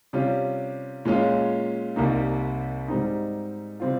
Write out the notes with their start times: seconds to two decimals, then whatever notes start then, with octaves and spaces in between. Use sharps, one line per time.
0.13 C3 G3 C#4 F4
1.05 A#2 G#3 C#4 F4
1.96 C2 C3 G3 A#3 D#4
2.88 G#2 G3 C4 D#4
3.80 C3 G3 C4 F4